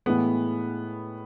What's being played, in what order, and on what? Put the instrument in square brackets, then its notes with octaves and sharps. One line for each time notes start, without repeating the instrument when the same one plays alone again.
[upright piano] A2 E3 G#3 B3